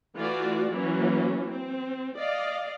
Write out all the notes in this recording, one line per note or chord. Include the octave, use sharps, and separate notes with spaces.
E3 A3 F4 F#4 D5
E3 F#3 A#3 C#4
C4
D5 D#5 F5